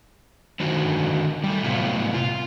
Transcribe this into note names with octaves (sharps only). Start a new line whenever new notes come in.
D3 D#3 C4 D#4 F#4
G3 A3
A2 C3 F#3 B3 F4
F4